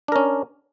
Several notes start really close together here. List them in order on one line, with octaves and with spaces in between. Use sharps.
D4 A#4 C#4